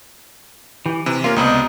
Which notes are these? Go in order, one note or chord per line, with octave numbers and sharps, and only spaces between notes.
E3 G4
C3 E3
A#3 C#4 F4 A#4
C#2 C3 B3 D4 D#4 D#5 B5